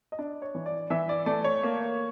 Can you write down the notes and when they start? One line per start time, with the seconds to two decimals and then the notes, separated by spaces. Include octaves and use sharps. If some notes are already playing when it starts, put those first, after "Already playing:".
0.12 D#5
0.19 D4 D5
0.42 C#5
0.55 E3
0.66 D5
0.90 E3 E5
1.09 D5
1.26 A3 D5
1.44 C#5
1.63 A#3